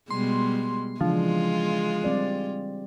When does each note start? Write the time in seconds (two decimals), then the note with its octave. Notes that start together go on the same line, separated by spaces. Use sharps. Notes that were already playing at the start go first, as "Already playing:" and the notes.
0.11 B2 G3 G#3 C6
1.01 C#3 E3 F3 G#3 D4 F4
2.04 G3 C4 D5